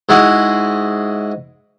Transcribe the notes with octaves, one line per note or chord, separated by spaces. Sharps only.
G#2 G#3 E4 F#4